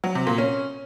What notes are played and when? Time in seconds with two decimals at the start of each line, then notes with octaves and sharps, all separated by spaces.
0.04 F#3
0.15 C3
0.27 A#2
0.38 C#4